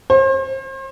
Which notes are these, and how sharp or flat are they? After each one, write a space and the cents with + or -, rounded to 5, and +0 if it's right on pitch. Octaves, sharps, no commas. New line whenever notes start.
C5 +40